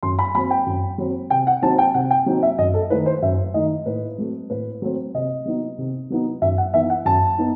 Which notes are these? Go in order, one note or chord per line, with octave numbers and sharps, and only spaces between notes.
F#2 C6
B5
F#3 C4 B5
G5
F#2
F#3 C4
C3 G5
F#5
F#3 C4 D#4 A5
G5
C3 F#5
G5
F#3 C4 D#4
E5
F#2 D#5
A4
D#3 A3 D#4 B4
C5
F#2 E5
D#3 A3 D#4 D#5
A2 B4
F#3 A3 C4
A2 B4
F#3 A3 C4
C3 D#5
F#3 B3 D#4
C3
F#3 B3 D#4
F#2 E5
F#5
E3 B3 D#4 E5
F#5
F#2 A5
B3 D#4